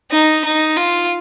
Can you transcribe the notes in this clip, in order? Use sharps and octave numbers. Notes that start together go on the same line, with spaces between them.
D#4
D#4
F4